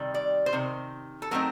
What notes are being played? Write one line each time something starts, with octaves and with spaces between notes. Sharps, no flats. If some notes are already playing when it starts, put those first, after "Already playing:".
Already playing: C3 D#3 G3
D5
C5
C3 D#3
A4
F#3 A3 C4 D#4 A#4